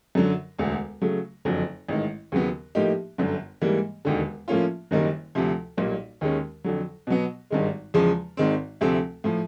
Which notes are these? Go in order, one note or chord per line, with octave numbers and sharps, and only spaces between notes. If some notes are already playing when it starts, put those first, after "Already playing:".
F#2 D3 F#3
E1 D2 D3
C#3 F#3 A3
F#1 F2 D3 F#3
A1 G#2 D#3
D#2 C#3 F#3 B3
A2 F3 A#3 D#4 G4
G1 F#2 D3
G#2 E3 G3 A#3
E1 D#2 D3
A2 F3 A#3 C#4 F4
F#1 F#2 D#3 G3 A#3
D2 C3 F3
B1 A#2 G3 A#3
D#2 D#3 G#3 C#4
F2 D3 F#3
B2 F#3 B3
G#1 G2 D#3 G#3
E2 C#3 F3 G#3
G#1 G#2 D#3 G#3 C4
D2 C3 F3 A3 C4
A2 F3